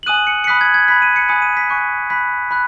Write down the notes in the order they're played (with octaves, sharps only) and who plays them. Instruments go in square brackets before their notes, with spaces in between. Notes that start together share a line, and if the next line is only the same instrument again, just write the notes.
[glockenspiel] F#7
G#5 D#6 F#6 D#7
C#7
C#7
B5 D#6 F#6 B6
G#6
G#6
B5 F#6 B6
D#7
C#7
G#5 B5 D#6 F#6 C#7
D#7
B6
G#5 C#6 F#6
B5 F#6 B6
B5 F#6